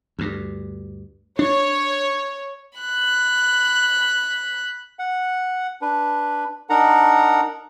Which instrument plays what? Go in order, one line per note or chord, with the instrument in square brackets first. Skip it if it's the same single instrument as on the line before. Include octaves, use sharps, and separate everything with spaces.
[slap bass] D2 G2
[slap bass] D4 [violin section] C#5
[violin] B5 F#6
[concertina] F#5
D4 B4
D4 D#4 A#4 F#5 A#5